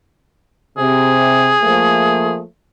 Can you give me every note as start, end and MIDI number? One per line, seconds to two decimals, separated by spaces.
0.78 1.52 48
0.78 2.38 68
1.62 2.42 53
1.62 2.42 57
1.62 2.42 58